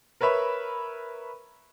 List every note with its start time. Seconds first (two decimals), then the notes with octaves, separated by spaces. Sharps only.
0.21 A#4 B4 C#5 E5 B5